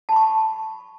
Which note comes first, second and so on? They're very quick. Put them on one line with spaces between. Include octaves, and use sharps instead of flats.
A5 B5 C#6